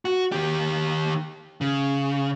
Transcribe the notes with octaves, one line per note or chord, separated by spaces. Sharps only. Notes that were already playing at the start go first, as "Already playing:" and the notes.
F#4
D#3 G4
C#3